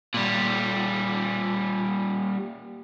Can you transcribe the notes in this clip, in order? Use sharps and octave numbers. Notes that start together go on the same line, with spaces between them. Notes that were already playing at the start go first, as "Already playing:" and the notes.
A#2 G3